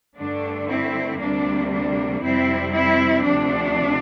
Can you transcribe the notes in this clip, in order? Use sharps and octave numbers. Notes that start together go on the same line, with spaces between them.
G2 D3 A3 D4
C4 E4
D2 C3 G3 A#3 D4
D4
F2 C3 G3 C4 E4
C4 E4
D2 C3 F3 D4